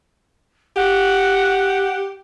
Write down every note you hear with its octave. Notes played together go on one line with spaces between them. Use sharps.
G4 F#5